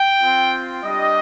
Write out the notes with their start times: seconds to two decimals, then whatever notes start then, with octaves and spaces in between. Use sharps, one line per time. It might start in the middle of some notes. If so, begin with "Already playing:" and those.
Already playing: G5
0.19 C4 F4
0.83 G3 D4 G4 D#5